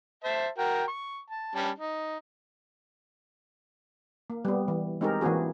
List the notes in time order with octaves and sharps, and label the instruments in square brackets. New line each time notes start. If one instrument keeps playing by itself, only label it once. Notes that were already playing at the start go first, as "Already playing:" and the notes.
[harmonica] C5 E5 A5
F#4 A#4 G5
C#6
A5
G3 C#4 A5
D#4
[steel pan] A#3
G3 B3
E3
G#3 C4 D#4 G4 G#4 A#4
E3 A#3 C4 F#4 G#4